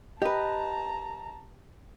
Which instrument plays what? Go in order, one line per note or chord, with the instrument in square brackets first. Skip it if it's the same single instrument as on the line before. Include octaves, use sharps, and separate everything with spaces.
[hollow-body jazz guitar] G4 B4 [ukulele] D#5 [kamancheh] A5 A#5